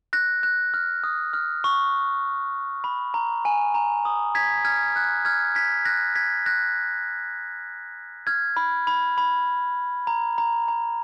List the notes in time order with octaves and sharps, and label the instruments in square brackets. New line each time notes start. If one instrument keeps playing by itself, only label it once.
[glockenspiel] F#6 A#6
F#6
F6
D#6
F6
C#6
B5
A#5
G#5
A#5
D#6
G#6 B6
F6 G#6
F#6
F6 G#6
G#6 B6
F#6 A#6
G#6 B6
F#6 A#6
F6 G#6
B5
B5
B5
A#5
A#5
A#5